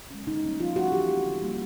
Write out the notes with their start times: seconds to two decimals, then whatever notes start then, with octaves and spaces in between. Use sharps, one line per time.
0.10 G#3 C#4
0.27 D#3 D#4
0.44 G3 A#3 C#4
0.60 F3 F4
0.76 A3 C#4 F#4
0.92 E3 G4
1.09 A3 C4
1.26 D3
1.42 G3 A#3